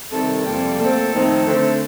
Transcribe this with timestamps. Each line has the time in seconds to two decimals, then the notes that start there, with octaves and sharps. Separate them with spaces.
0.11 C3 D#3 G3 A4
0.45 F2 C3 G3 A#3
0.78 A#2 A3 C4 A4
1.13 F2 D#3 A3 C4
1.46 D3 A3 C4